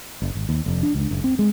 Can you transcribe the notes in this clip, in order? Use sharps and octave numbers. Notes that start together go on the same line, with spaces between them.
F#1
G#1
D#2
F1
D4
C#2
F#1
C4
G#3